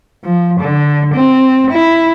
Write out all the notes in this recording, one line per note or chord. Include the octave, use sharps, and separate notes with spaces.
F3
D3
C4
E4